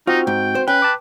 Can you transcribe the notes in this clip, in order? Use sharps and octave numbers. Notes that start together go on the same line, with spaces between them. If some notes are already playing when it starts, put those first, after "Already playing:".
C4 D#4 F4 F#4
G#2 G5
C5
C#4 B4 G5
A5 D6